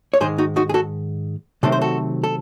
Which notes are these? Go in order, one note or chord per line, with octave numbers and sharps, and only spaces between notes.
C#5
G#2 D#3 G#3 G#4 C5
D#4 F#4
D#4 F#4
G#4
F#4 A4
C3 D#3 F#3 A3 C4 A4
C5
F#4 A4
A4